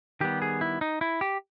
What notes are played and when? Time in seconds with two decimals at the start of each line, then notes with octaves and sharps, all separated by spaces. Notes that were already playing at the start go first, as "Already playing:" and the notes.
0.21 D#3 G3 B3 G4
0.42 G#4
0.61 E4
0.81 D#4
1.01 E4
1.21 G4